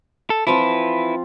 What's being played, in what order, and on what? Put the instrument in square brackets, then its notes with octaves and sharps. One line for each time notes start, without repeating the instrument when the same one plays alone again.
[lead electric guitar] A4
[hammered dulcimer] F3 C4 F4 [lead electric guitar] E4 B4